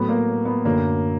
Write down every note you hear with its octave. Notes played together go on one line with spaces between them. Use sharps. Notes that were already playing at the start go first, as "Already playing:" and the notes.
Already playing: A2 F#3 A3 B3
A#3
B3
F#2 D3 F#3 A3 A#3